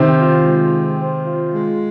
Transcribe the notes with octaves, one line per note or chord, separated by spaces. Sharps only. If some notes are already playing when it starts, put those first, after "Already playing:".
Already playing: C3 D#3 C5
F4
G#3
C4
C5
F4
G#3